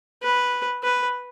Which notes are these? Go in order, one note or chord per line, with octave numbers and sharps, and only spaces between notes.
B4
B4